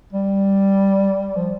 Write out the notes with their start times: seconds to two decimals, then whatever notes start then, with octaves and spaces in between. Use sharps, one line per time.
0.13 G3
1.36 F3